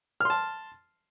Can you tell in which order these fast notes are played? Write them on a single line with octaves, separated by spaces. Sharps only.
F6 C6 A5